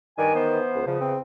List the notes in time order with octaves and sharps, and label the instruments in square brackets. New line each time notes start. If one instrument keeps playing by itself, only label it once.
[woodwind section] G2 D5 G#5 [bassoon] D#3
[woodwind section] E3 B3 C5
[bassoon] C#2
[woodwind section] E2 C#3 [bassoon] F3
[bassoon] C4